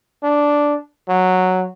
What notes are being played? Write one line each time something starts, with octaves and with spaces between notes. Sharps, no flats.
D4
F#3